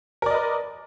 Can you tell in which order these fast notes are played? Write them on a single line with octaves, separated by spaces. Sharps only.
A#4 D5 D#5 B4